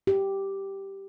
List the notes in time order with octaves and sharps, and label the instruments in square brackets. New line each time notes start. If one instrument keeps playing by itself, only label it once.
[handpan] G4